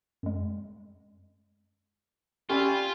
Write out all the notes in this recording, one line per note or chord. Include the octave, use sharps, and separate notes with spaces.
F#2 G#3
C#4 F4 G4 D5 E5 G#5 B5